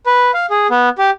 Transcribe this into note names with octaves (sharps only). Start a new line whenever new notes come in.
B4
F5
G#4
B3
G4